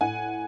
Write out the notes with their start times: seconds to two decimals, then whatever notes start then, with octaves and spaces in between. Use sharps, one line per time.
0.01 A2 F#5 G#5